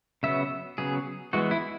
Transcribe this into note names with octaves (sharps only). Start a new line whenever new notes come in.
C#3 F#3 B3 E5
C#3 F#3 B3 G#4
E3 G#3 B3 F#4
E4